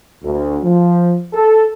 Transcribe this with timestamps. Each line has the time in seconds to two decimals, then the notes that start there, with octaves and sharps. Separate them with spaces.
0.23 D2
0.64 F3
1.34 A4